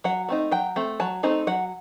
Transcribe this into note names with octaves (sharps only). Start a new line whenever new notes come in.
F#3 F#5
A3 C4 D#4
F#3 G5
A3 C4
F#3 A5
A3 C4 D#4 A#5
F#3 F#5